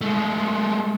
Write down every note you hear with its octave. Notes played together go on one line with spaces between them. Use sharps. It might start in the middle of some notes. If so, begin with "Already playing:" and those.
G#3 A3